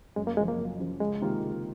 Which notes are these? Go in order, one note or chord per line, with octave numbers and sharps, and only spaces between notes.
F#2 G#3
A#3
C#3 F3 G#3
A#3
F#2
C#3 F3
C#2 G#3
C3 D#3 A#3 F4
C#2